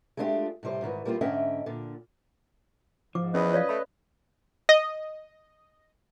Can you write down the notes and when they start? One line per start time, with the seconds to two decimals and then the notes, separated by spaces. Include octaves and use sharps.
0.17 G#3 A3 D4 E4 F4 G4
0.63 A2 C3 G3 C5
0.82 G#2 D#3 E3
1.05 G3 A#3 C4 E4 F4
1.21 G#2 D3 C#4 D#5 E5 G5
1.66 A#2 D3
3.15 G#2 F3 D6
3.34 E2 C#4 B4 D#5
3.53 C#5 D5 F5
3.69 A3 B5
4.69 D#5